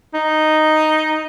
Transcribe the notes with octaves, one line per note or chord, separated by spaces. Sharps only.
D#4